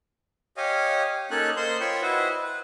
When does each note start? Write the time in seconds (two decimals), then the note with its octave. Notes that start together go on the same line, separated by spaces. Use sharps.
0.57 G4 C#5 D#5 F5 G#5
1.31 A#3 C#4 D#4 A4 C#5 F#6
1.57 A#3 C5 D#5 C6 G6
1.80 F4 C#5 G5 B5 C#6
2.02 E4 F#4 B4 C5 D#5
2.42 B4